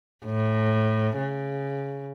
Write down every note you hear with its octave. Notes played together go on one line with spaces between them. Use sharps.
A2
C#3